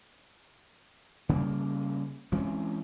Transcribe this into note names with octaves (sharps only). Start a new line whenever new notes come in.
C#3 G3 A#3
E3 G#3 C4 C#4